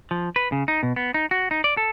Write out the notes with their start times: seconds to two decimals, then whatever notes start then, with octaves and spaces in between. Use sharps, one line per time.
0.11 F3
0.36 B4
0.52 C#3
0.68 D#4
0.83 B2
0.96 B3
1.14 D#4
1.31 F#4
1.51 D#4
1.64 D5
1.77 A4